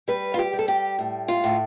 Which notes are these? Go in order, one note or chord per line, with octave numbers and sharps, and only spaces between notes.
G3 B4
F4
G4
G3
A4
G4
A2
F4
A2